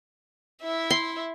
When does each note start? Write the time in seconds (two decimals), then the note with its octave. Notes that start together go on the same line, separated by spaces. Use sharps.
0.62 E4 E5
0.90 C6